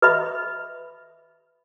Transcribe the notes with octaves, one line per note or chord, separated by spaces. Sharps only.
B4 D#5 E5 B5